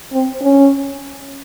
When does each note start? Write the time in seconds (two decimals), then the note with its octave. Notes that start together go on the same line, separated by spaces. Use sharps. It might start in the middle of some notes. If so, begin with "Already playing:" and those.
0.13 C4
0.42 C#4